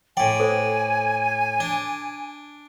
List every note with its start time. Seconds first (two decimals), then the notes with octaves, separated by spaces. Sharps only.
0.17 A2 D5 G5 G#5
0.40 A4 C5
1.60 D4